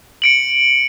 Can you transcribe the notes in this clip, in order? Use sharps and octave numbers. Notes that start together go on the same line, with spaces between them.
C#7 D7 F#7